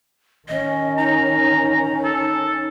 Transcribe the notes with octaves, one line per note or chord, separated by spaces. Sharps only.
D#3 C#4 D#5
D#4 A#5
A4